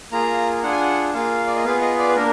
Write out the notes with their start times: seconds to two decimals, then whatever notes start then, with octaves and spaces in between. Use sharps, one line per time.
0.12 A#3 F4 G#4 A#5
0.63 D4 F4 G#4 F#5
0.72 G#5
0.81 F#5
1.14 A#3 F4 G#4 F5
1.47 D5
1.56 D#5
1.65 B3 F4 G#4 F5
1.81 D#5
1.99 D5
2.09 B4
2.16 A#3 D4 A#4